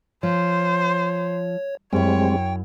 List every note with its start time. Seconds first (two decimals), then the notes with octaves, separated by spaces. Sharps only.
0.23 F3 C5 C#5
1.93 F#2 G3 G#3 C4 E4 C#5 G5